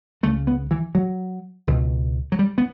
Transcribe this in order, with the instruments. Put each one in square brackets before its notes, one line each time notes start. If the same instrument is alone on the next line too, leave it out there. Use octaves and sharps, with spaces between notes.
[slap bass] C#2 C#3 A3
B3
E3
F#3
C#2 B2
F#3
G3
B3